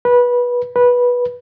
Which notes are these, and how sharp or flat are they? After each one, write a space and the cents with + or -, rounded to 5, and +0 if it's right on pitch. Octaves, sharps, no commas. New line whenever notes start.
B4 -20
B4 -15